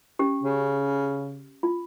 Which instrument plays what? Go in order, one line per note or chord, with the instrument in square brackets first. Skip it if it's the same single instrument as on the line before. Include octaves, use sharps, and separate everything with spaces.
[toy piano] C#4 G4
[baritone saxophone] C#3
[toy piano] F4